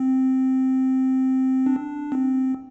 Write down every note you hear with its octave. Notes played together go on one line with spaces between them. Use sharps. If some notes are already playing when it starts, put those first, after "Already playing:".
Already playing: C4
D4
C4